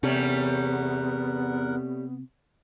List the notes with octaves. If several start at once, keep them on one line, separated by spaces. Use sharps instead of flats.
E2 C3 G3 A3 B3 C#4 A#4 F#5